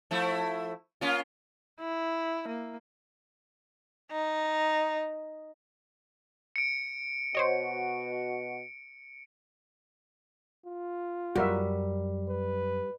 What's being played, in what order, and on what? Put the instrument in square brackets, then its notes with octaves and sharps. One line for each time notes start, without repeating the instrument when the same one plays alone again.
[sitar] F3 A3 E4
A#3 C#4 F4
[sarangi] E4
A#3
D#4
[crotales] C#7 D7
[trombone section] B2 F#4 [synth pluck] C5 C#5 D#5
[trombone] F4
[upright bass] F#2 [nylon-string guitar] G3 [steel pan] F#4 A#4 E5
[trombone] B4